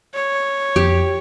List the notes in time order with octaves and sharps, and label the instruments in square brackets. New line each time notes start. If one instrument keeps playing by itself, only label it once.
[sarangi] C#5
[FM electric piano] F2 [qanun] G4